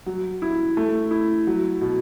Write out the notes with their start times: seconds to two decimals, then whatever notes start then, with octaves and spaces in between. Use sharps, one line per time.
0.06 F#3
0.42 E4
0.77 A3
1.11 E4
1.47 F#3
1.81 B2